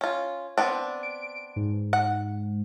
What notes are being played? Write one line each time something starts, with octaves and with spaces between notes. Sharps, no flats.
C#4 F4
B3 C4 D4
D7
G#2
F#5